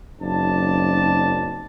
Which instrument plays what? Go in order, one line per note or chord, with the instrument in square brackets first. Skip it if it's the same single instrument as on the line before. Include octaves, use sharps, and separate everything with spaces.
[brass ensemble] F#1 F#2 C4 D#4 D5 A5